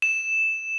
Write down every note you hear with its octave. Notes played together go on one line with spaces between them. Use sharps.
E7